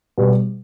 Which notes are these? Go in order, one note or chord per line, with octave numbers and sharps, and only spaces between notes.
B2 G3 B3